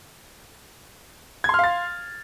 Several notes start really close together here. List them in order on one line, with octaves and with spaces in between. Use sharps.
G#6 C6 F6 F5 A6